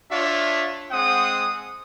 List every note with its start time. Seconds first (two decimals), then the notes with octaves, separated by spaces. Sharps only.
0.11 D4 F4 C#5 E5
0.91 G#3 C4 F#5 D#6